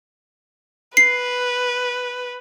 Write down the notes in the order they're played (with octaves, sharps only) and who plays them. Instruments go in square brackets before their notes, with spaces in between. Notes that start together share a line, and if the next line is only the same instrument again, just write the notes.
[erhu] B4 [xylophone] C7